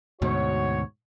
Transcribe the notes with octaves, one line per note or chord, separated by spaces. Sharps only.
D2 G#2 B2 F#4 C#5